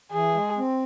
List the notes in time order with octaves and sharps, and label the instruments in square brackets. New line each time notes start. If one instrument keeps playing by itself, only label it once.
[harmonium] E3 [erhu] G#4
[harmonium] G#3
C4